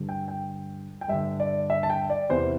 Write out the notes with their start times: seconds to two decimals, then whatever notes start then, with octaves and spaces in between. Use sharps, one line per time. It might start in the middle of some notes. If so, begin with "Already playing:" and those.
Already playing: G2 D3
0.09 G5
0.28 G5
1.01 G5
1.08 G2 D3 E5
1.40 D5
1.70 E5
1.83 A5
1.90 G5
2.10 D5
2.29 E2 C3 E3 C5